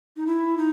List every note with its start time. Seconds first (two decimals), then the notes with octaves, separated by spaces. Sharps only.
0.17 D#4
0.27 E4
0.57 D#4